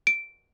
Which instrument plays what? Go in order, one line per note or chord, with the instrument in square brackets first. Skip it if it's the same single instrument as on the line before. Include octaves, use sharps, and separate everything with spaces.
[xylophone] D7